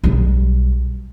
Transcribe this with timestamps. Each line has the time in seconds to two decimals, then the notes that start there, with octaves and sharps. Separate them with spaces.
0.04 B1 G3